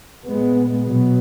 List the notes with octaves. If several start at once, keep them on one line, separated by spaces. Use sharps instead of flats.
A#2 G#3 B3
B2 F#3 B3